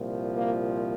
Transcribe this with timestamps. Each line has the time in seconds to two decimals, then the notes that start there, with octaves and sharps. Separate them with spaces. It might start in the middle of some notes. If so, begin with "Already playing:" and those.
Already playing: C2 A#2 F3
0.36 A#3